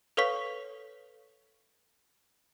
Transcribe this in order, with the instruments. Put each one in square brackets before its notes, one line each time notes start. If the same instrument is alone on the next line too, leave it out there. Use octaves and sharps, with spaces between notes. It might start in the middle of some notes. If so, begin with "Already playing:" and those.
[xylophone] A4 B4 C#5 F5 C#6 B6